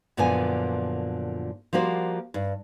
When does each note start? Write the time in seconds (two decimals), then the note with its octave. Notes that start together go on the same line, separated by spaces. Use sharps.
0.17 F#2 A#2 D3 F3 B3 G#5
1.73 F3 G3 A#3 F#4 C5
2.34 G2